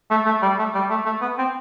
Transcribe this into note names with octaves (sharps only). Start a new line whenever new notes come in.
A3
A3
G3
A3
G3
A3
A3
B3
C4